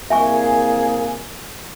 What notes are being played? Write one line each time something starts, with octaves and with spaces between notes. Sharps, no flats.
C2 A#3 G#4 E5 G#5 C#6